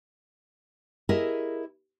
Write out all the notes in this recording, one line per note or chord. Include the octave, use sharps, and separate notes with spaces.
E4 G4 G#4 A#4 D#5 E5